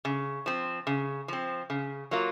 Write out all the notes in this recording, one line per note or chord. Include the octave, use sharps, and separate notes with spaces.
C#3
F3 C4
C#3
F3 C4
C#3
F#3 A#3 F4